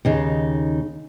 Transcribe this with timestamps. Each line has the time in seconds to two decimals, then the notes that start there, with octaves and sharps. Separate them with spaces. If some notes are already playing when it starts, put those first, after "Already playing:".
0.05 D#2 C#3 D#4